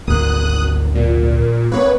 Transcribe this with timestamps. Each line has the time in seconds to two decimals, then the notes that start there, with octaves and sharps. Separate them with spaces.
0.07 G#1 D2 A#3 D#6 F#6
0.95 A#2
1.72 A#3 C4 B4 C#5